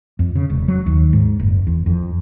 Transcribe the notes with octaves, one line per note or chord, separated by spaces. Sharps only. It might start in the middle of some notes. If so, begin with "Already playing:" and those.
F2
C#3
E1
F#3
D#2
G#2
F#1
E2
F2